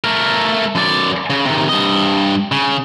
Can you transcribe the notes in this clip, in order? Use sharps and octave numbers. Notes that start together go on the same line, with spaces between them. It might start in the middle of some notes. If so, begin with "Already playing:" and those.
A3 A#4
F#2 D5
C#3
C3 D#3
G2 D#5
C#3